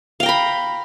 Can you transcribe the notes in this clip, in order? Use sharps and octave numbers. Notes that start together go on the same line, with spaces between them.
F5 G5 A#5 B5